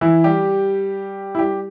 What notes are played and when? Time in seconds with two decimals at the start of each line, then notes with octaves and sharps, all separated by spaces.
0.01 E3 E4
0.24 G3 G4
1.35 E4
1.39 G3 G4